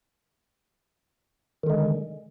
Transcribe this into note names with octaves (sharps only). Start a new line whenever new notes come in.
D3 D#3 G#3